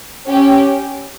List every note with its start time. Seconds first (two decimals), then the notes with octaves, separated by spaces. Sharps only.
0.26 C#4 G4